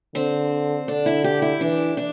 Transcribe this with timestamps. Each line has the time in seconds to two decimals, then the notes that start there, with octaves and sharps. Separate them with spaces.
0.15 D3 C4
0.88 D3 D4
1.06 E4
1.24 G4
1.42 E4
1.61 E3 D4
1.97 D4